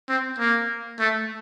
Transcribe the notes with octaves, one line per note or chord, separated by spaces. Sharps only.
C4
A#3
A3